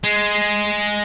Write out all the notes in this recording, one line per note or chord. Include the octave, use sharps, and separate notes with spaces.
G#3